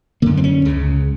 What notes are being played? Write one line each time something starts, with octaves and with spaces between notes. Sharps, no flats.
F#2 D3 A#3
C4
C#4
C#2 C#3